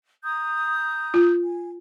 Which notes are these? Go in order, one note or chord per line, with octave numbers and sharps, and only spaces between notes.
A#5 D#6 G6
F4
G#5